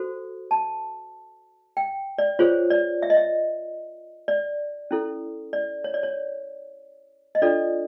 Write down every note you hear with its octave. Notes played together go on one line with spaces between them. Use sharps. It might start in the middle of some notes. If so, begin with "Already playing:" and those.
Already playing: F#4 A4 C5
A5
G5
D5
F4 G#4 C5 C#5
D5
E5
D#5
E5
D5
C#4 E4 A4
D5
C#5
D5
C#5
D#5
D4 F4 A4 D5